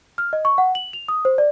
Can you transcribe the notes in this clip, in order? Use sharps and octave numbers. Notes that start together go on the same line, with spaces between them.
F6
D#5
C#6
F#5
F#7
F7
D#6
C5
D5